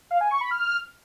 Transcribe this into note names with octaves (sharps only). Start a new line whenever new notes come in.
F5
G#5
C#6
B5
F6